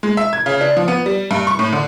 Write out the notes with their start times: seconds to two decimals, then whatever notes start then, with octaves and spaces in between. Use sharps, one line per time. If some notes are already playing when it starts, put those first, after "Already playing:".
0.03 G#3
0.17 E5
0.33 G#6
0.46 C#3
0.61 D4
0.77 F3
0.88 B3
1.06 G3
1.31 G2
1.47 C#6
1.59 A2
1.73 D3